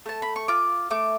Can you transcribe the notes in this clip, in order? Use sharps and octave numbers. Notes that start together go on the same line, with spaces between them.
A3 A5
B5
C#6
F4 D6
A3 D6